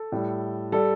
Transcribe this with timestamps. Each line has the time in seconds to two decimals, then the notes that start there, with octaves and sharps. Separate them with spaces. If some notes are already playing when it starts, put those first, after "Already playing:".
Already playing: A4
0.12 A2 G3
0.72 G3 A4